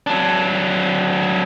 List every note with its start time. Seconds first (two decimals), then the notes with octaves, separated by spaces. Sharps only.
0.07 F#3 D4